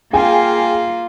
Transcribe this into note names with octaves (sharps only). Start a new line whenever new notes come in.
A#3 F4 G#4 G5 G#5